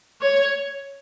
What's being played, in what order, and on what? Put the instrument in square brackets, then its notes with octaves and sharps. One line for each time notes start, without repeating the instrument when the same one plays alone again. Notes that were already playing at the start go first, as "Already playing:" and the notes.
[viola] C#5